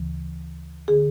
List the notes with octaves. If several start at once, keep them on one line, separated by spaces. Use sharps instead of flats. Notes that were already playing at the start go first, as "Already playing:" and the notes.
Already playing: D2 C#3 E3
D3 G#4